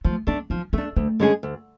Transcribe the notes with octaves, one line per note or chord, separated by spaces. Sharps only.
F3 A3
A3 B3 D4
F3 D4
A3 C#4 D4
D2 A3
D3 G#3 C#4 G#4
D2